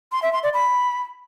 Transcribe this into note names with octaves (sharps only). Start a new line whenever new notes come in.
C6
E5
C6
D5
B5